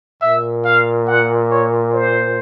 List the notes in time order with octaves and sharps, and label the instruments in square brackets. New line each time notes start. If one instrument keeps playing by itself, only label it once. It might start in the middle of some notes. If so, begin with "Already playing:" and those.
[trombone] A#2 [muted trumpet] E5
[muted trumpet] F5
F#5
C#5
C5